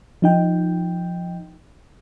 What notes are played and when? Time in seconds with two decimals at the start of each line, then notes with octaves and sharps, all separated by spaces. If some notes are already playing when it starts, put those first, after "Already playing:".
0.22 F3 D#4 G5